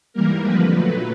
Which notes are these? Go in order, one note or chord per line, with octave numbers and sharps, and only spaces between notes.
G#2 E3 G3 A#3 A#4
F2 D3 F3 B4
A#2 F#3 A3